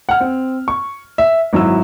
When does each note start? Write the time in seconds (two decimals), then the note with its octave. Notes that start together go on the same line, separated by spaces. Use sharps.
0.09 F#5 F6
0.20 C4
0.68 C#6
1.18 E5
1.53 G#1 F#3 E4 E6